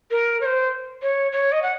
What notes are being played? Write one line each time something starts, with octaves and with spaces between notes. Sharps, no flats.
A#4
C#5
C5
C#5
C#5
D#5
F#5